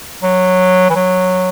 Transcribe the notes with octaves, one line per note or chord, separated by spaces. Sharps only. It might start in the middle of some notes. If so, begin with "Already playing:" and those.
F#3
E3
F#3